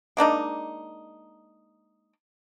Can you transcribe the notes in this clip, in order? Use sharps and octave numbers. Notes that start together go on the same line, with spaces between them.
G#3 A#3 D4 D#4